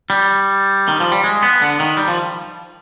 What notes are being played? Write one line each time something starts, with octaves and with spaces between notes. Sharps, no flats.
G3
D#3
F3
G3
G#3
B3
D3
D#3
G3
F3